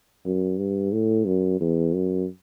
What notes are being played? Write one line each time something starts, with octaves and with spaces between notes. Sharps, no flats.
F#2
G2
A2
F#2
E2
F#2